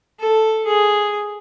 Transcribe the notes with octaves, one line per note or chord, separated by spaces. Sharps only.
A4
G#4